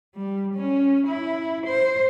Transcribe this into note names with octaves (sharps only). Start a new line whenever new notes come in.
G3
C#4
E4
C5